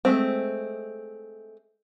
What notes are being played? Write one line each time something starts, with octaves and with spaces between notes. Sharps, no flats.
G#3 A3 C4